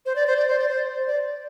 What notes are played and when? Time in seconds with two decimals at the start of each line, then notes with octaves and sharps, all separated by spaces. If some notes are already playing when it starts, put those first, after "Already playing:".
0.06 C5
0.16 D5
0.27 C5
0.37 D5
0.48 C5
0.59 D5
0.68 C5
1.08 D5